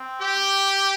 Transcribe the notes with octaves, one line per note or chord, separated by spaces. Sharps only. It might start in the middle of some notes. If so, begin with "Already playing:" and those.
Already playing: C4
G4